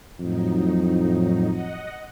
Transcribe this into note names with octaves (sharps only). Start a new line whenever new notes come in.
F2 A2 F#3 D#4
D#5 F#5